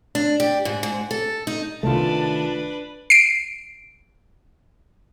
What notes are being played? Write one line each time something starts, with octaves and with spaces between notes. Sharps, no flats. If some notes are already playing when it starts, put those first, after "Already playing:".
D4
G4
G#2
G#2
A4
D#4
C2 D#3 A3 D4 F4 B4 A5
C7 D7